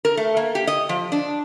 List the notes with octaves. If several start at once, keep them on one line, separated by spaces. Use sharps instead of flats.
A#4
A3
A#3
G4
D#5
F3
D4